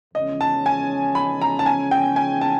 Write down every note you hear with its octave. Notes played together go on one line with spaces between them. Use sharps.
E2 C#3 F3 G#3 C#4 D#5
A5
G#5
B5
A#5
A5
G#5
G5
G#5
A5